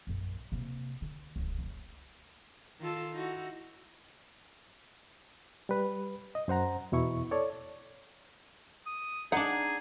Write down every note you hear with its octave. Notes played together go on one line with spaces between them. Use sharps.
A#1 F#2
C3 A#3
D3
D1 C#2
F#1
D#3 F4 A4
D#4 E4 F#4
G3 B4
D#5
F#2 C5 F#5 A#5
E2 B2 E4 C#6
A4 C#5 D5
D#6
D4 D#4 G#4 F#5